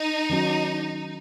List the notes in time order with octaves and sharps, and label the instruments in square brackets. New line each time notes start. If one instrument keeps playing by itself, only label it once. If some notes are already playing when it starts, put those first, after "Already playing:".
Already playing: [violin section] D#4
[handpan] D#3 F#3 C#4 F#4